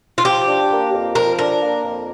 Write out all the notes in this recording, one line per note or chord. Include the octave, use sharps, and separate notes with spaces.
F4
F3 G4
D4
A#3
F2
F3 A#4
D4 A#4
A#3
F2